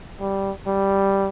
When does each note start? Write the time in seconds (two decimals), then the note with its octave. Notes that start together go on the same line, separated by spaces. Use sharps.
0.20 G3
0.67 G3